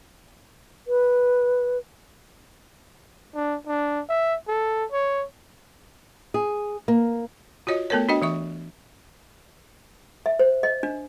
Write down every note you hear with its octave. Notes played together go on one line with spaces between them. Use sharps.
B4
D4
D4
E5
A4
C#5
G#4
A#3
F4 F#4 C#5 D#5
A3 B3 A4 A#4 C#5
D4 F#4 D#5 G5
E3 E5 C#6
E5
C5
D#5
D4